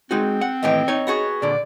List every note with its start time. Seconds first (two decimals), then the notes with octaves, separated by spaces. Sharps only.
0.11 G#3 C4 D#4 F#4
0.41 F#5
0.63 D#2 A2 E3 D#5 G5
0.88 D#4 C#5
1.07 B3 F#4 G#4
1.42 A#2 D3 D5